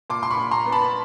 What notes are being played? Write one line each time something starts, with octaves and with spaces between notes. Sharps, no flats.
A#2 C6 D6
C6
B5 C#6
A#2
A#5 C6
B3
A5 B5